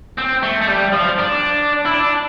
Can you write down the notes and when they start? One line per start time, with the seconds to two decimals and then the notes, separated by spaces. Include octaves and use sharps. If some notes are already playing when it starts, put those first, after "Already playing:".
0.18 C4
0.43 A3
0.62 A3
0.68 G3
0.93 F3
1.18 D4
1.85 E4
1.94 D4